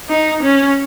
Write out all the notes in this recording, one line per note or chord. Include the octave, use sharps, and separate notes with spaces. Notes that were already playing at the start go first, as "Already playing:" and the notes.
D#4
C#4